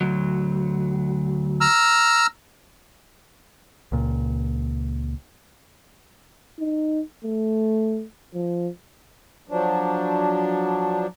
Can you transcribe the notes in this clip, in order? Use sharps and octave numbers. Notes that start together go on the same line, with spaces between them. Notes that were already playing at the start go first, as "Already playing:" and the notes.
D2 F#3
A#5 E6 F6
C#2 A#2
D#4
A3
F3
F3 F#3 D4